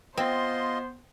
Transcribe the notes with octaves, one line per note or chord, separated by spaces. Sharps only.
B3 C4 F4 C5 D#5 C6